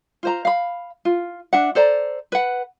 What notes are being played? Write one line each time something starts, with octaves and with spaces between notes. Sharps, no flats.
F4 C5 A#5
F5 B5
F4
D4 E5 F#5
A4 C5 D5 A#5
B4 F#5